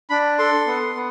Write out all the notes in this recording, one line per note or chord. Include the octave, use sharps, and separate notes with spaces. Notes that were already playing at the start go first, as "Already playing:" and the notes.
D4 B5
A4 C6
B3
B3